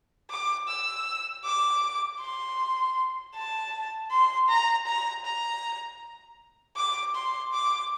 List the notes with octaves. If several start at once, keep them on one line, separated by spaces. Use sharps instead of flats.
D6
E6
D6
C6
A5
C6
A#5
A#5
A#5
D6
C6
D6